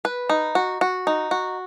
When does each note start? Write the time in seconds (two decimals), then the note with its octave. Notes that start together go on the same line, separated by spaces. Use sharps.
0.05 B4
0.29 D#4
0.55 F#4
0.81 F#4
1.07 D#4
1.31 F#4